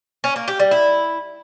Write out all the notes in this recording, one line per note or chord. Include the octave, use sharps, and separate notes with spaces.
C#4
A#3
G4
G3
E4